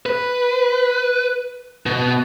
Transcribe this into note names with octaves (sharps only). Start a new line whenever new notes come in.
B4
B2